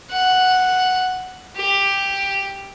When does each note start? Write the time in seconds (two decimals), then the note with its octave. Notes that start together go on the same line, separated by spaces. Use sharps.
0.10 F#5
1.57 G4